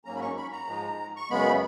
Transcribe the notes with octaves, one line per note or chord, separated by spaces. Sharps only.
G#2 F#3 A#3 C#4 A#5
B5
C#6
B5
A#5
G#2 F3 G#3
C#6
F#2 C#3 G#3 B3 B5